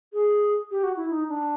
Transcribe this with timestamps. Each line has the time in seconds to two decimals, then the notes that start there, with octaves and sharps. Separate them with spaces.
0.13 G#4
0.71 G4
0.83 F#4
0.96 E4
1.10 D#4
1.29 D4